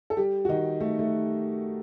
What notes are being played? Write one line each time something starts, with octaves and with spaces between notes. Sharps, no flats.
A4
G3 G4
F#4
D#3 D#4
A3
A3